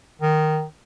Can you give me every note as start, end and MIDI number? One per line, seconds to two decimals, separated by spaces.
0.21 0.64 51